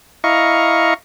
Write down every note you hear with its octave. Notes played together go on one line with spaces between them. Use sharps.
E4 D#5 F5 A#5 C#6